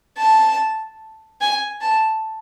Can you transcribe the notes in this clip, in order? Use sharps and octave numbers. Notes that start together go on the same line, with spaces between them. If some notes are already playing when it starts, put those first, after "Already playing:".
A5
G#5
A5